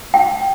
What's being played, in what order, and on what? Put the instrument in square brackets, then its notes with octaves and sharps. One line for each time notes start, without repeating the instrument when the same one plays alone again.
[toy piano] G5